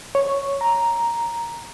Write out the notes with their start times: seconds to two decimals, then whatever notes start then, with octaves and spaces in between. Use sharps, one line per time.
0.15 C#5
0.61 A#5